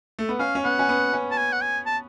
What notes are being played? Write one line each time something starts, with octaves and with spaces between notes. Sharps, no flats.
A3
B3
C#4 F5
C#4
B3 F#5
C#4
B3
C#4
A5
G#5
F#5
G#5
A5